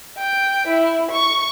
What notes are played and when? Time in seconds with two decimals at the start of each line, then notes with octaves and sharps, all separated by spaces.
0.18 G5
0.68 E4
1.11 C#6